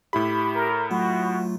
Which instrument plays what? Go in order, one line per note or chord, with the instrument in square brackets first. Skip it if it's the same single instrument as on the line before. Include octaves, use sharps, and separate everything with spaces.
[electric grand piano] A2 E4 B5 [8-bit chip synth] G4
[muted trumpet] A#4
[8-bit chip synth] F#3 A3 F4 [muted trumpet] F#4